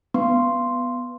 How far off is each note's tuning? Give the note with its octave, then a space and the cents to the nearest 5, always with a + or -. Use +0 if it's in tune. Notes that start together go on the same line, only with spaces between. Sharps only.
B3 +0 C6 +0